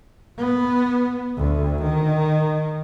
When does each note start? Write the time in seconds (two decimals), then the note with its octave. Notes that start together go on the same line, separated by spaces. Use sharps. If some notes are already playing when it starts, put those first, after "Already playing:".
0.38 B3
1.37 D2
1.83 D#3